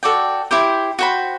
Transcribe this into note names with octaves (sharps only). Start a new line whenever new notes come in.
F#4 A4 D5 G5
E4 G4 C5
F#4 C5 G5 B5